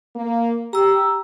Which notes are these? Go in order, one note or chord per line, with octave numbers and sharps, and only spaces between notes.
A#3
G4 A#5 E6